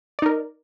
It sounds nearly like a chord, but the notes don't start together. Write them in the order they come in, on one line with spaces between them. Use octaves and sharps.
D5 D#4 A#4